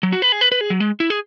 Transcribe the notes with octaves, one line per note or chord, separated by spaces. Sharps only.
F#3
F#4
B4
G#4
B4
B4
G#4
F#3
G#3
E4
G#4